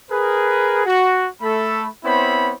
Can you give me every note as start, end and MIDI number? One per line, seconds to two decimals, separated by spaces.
0.11 0.83 68
0.11 0.83 70
0.11 0.83 71
0.86 1.27 66
1.42 1.86 57
1.42 1.86 69
1.42 1.86 83
2.04 2.53 59
2.04 2.53 60
2.04 2.53 64
2.04 2.53 72
2.04 2.53 73
2.04 2.53 83